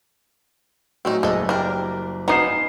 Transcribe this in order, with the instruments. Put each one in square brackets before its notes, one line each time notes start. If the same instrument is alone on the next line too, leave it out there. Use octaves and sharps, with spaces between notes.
[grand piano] A2 F#3 [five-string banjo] C4 C#4 D#4
[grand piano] F#1 [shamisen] G#3 [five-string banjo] A4 D#5
[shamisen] G3 [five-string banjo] D4 A#4
[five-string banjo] B3 F4 G#4 [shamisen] D#4 F#4 [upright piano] A#5 C7 E7